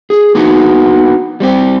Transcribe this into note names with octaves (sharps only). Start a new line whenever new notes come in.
G#4
A#3 B3 D#4 F#4
G3 C4 G4